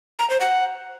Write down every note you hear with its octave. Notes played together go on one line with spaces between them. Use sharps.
A#5
C5
F#5